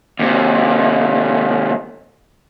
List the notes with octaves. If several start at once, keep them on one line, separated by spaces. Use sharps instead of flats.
D#2 C3